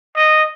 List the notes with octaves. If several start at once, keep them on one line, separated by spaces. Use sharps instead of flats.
D#5